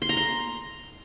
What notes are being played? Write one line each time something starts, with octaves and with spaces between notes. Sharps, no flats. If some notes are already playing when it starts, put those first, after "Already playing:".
C6
A#5
C6